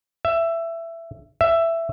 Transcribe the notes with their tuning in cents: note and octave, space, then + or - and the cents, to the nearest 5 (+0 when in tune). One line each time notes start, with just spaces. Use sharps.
E5 +15
E5 +10